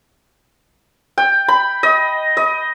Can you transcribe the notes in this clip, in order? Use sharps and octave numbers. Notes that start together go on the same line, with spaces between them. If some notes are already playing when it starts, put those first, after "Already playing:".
G5
B5
D#5
D#5